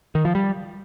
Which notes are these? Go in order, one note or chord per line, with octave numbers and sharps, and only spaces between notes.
D#3
F3
G3